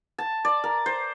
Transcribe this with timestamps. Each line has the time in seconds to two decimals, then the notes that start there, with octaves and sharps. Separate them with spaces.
0.18 A5
0.45 D5
0.64 A#4
0.86 C5